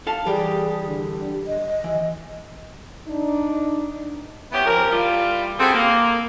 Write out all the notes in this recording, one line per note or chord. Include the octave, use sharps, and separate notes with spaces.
A4 F5 A5
E3 G3 G4 G#4
D3
D#5
E3
D4 D#4
B3 C#4 E4 G4
F3 C4 C#4 A#4
G3 E4 F4
C4 E4 F#4 G#4 A4
A#3